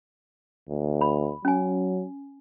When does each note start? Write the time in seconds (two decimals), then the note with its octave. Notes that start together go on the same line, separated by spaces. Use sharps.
0.69 D2
1.01 B5
1.45 F#3 C#4 G#5